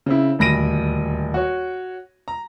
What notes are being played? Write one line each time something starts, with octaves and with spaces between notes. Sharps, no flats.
C#3 C4 E4
D#1 D2 B5 A#6 D7 D#7
F#4 C#5
A#5